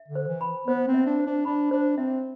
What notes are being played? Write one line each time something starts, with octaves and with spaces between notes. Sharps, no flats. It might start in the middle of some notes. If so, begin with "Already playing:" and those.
Already playing: E5
D3
C5
E3
B5
B3 C5
C4
E5
D4
C5
D4
D4 B5
D4 C5
C4 E5